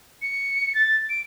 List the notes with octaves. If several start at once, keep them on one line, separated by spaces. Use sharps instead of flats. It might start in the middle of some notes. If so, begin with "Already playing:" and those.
C#7
A6
D7